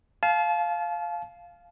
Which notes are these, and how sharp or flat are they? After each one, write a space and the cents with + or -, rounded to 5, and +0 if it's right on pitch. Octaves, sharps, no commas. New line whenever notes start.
F5 +0 A5 -35